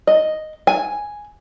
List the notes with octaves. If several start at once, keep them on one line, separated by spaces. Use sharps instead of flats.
D#5
G#5